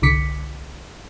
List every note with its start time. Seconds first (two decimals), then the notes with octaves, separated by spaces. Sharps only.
0.02 G1 C2 D3 D6 B6 C#7